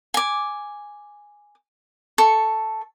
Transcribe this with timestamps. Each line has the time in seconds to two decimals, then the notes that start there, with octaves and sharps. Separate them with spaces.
0.14 G#5 D6
2.18 A4 C#6